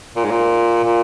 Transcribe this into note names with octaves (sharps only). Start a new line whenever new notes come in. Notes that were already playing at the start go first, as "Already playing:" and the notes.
A#2
G#2
A#2
A#2